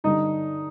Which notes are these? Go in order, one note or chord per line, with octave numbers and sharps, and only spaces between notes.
G2 D3 G3 D#4